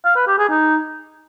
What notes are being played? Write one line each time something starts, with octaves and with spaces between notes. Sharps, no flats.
F5
B4
G4
G#4
D#4